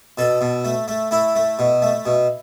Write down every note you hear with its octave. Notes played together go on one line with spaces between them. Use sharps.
B2 A4
B2
A3
A3
A3 E4
A3
B2
A3
B2